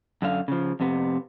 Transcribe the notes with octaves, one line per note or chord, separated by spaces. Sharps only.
F#2 D3 F5
C#3 F3
F2 C3 B3